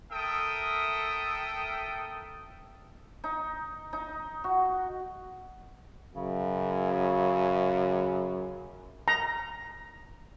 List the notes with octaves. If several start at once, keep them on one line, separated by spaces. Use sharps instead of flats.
A4 A#4 E5 G5 D#6
D#4
D#4
F#4
F#2 C#3
A#5